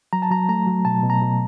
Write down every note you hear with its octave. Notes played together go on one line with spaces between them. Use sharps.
F#3 A#5
A5
F#3 A#5
A3 A#5
F#3
B2 A5
B2
A#5
B2